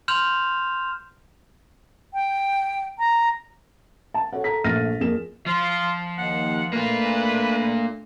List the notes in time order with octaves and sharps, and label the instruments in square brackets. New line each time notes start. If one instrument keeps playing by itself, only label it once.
[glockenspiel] C6 F6 G6 E7 F7
[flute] G5
A#5
[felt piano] A5
F#4 A4 C#5 F#5
A4 A#5 B6
A#1 A3 F6 A6 A#6 D#7
F2 A#3 F4 G#4 E7
[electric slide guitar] F3 [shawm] F4
[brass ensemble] D#2 [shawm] F#5
[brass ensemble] A3 D4 [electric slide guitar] A#3 F4 [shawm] B4